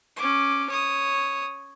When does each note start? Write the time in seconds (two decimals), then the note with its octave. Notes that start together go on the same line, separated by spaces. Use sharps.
0.16 C#4 D6
0.70 C#5 D#6